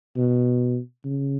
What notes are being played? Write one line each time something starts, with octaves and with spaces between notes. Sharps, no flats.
B2
C#3